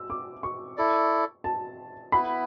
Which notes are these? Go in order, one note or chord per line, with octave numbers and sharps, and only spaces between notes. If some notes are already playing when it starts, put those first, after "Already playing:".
Already playing: E6
D6
C#6
E4 A4 D5
A5
B3 E4 B4 B5